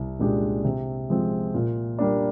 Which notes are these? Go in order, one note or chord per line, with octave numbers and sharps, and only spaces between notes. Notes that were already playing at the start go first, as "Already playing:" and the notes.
Already playing: C2
A#2 G#3 D4 G4
C3
F3 G#3 C4
A#2
G3 A#3 D4